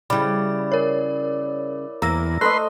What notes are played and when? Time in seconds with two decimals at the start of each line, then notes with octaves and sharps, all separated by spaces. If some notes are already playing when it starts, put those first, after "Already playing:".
0.10 C#3 G3 E4 D5 B5
0.72 A#4 C#5
2.02 E2 A#3 A#5 E6 A#6
2.41 A3 B4 C5 D#5 C6 F#6